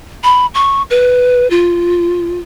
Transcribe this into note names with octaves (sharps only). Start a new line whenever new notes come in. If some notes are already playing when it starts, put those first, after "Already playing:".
B5
C#6
B4
F4